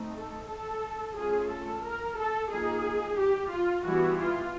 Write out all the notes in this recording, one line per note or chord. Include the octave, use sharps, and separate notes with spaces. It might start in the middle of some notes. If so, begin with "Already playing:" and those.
Already playing: A3 C4 D#4
A4
A4
A3 C#4 F4 G#4
A4
A#4
A4
F3 A#3 D#4 G#4
G4
F4
E3 G3 B3 E4 F#4
F4